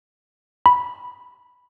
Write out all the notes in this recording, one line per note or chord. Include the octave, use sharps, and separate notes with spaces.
B5